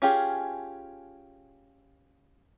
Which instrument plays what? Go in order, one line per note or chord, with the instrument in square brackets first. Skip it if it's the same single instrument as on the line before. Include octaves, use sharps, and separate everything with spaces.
[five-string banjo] C#4 F4 G4 G#4